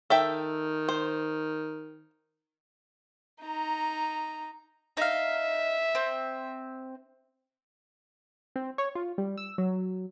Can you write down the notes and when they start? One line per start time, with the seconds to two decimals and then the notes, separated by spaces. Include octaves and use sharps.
0.10 D#3 A4 E5 G5
0.89 C5
3.43 D#4 A#5
4.97 D#4 E5 F5
5.95 C4
8.56 C4
8.78 C#5
8.95 F4
9.18 G3
9.38 E6
9.58 F#3